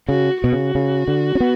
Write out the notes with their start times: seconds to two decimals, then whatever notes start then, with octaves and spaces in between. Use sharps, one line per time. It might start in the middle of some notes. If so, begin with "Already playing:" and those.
0.08 C#3 F#4
0.41 B2 F#4
0.53 C#3
0.75 C#3
1.08 D3
1.35 C#4
1.40 B3